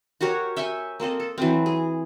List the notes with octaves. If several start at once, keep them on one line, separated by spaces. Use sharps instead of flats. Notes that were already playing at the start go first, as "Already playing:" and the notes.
F#4 G4 A#4 C#5
E5 G5 G#5 C#6
A#3 C4 A4 D#5
A4
E3 F#3 C4
G#4